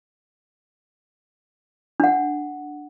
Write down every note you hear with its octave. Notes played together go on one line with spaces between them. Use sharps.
D4 F#5